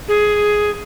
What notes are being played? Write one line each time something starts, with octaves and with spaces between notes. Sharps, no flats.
G#4